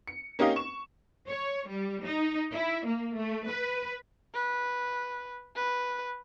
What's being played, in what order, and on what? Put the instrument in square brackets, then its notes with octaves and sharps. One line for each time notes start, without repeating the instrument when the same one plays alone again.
[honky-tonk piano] C#7
A#3 C#4 D#4 G4 D#5 F5
C#6 E7
[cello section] C#5
G3
D#4
E4
A#3
A3
B4
[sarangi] B4
B4